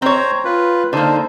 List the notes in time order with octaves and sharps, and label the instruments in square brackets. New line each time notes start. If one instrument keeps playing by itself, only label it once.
[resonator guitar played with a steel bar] C4 C#5 [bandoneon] C5 A#5
[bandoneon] F4 B4
[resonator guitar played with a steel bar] D3 A#3 [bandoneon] D#4 C5